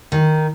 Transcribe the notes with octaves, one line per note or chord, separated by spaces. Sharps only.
D#3